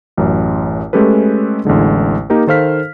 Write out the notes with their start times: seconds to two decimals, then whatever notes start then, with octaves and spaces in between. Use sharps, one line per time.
0.17 A1 F#2
0.93 G#3 A3 C#4 G4 A4 B4
1.65 A1 E2 D3 G#3
2.30 A#3 D#4 G4 A#4
2.47 D#3 A4 C5 F5 F6 B6